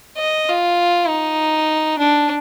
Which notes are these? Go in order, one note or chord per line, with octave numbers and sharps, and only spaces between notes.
D#5
F4
D#4
D4